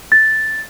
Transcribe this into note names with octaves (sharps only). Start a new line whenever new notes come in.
A6